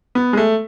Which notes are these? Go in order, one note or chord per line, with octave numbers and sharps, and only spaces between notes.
B3
G#3
A3